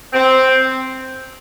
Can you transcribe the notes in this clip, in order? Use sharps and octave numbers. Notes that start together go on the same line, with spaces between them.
C4